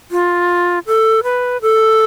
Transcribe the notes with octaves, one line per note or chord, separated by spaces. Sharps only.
F4
A4
B4
A4